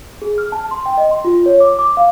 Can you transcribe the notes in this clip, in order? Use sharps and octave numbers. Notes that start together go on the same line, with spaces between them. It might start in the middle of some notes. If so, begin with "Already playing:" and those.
G#4
F6
A5
C6
G5
D#5
C6
F4
C#5
D6
D6
F5